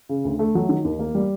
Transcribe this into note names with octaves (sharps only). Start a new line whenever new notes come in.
C#3
D2
A3
F#3
D#3
D#2
A#3
G3